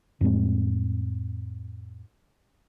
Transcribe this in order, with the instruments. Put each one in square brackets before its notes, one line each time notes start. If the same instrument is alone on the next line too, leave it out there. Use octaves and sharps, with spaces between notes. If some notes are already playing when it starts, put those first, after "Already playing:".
[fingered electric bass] F2 A2 G#3 C4